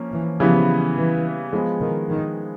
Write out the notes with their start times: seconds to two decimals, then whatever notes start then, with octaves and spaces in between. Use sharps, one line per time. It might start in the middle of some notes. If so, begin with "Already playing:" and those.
Already playing: F3 A#3 C#4
0.12 E3
0.40 C#3 E3 F3 G3 B3
0.96 E3
1.53 F3 G#3 B3
1.81 D#3
2.09 D#3